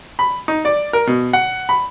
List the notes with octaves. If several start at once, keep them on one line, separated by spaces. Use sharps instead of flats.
B5
D#4
D5
A#4
B2
F#5
B5